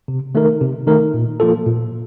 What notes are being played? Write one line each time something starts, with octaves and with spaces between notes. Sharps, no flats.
C3
D#3 A3 D#4 A#4
C3
D#3 A3 D#4 A#4
A#2
F3 A#3 F4 A4
A#2